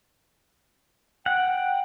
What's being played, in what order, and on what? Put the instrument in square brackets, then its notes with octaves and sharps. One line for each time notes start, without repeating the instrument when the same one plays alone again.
[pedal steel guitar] F#5 [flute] G5